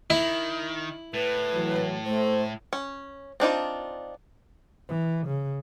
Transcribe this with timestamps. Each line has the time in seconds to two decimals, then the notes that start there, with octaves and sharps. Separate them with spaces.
0.10 D#3 E4
1.14 A2 B4
1.54 E3 F#3
2.06 A3 C5
2.73 C#4
3.40 C4 D4 D#4 F4
4.89 E3
5.27 C#3